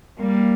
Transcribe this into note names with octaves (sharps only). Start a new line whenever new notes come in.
G3 A#3